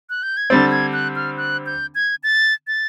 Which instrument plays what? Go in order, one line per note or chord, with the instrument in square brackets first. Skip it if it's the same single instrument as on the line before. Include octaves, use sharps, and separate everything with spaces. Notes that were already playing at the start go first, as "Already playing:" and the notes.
[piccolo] F#6
G6
G#6
[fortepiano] D3 G3 C4 [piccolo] A6
[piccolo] G#6
F#6
F6
F#6
G6
G#6
A6
A6